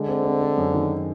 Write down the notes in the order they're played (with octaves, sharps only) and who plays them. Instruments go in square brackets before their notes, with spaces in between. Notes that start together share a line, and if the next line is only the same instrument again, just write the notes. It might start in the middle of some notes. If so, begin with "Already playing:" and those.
Already playing: [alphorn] D3 [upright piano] G#3
[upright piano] C4
C4
C4
F#2
D#3